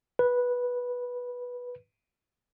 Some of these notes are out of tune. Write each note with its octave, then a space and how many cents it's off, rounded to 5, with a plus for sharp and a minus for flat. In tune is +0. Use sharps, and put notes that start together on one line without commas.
B4 -10